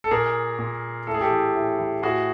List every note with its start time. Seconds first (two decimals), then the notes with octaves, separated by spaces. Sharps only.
0.04 A4
0.11 A#2 G#4 A#4
0.59 A#2
1.07 A2 A4
1.14 G#4
1.21 G4 A4
1.31 E3
1.55 A2
1.79 E3
2.02 A2 F#4 G#4